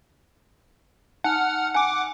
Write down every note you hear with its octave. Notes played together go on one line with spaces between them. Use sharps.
D#4 F#5 G#5 A5 F6
F#5 G#5 D6